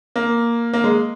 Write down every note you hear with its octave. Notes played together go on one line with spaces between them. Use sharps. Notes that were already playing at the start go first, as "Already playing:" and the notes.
A#3
A#3
G#3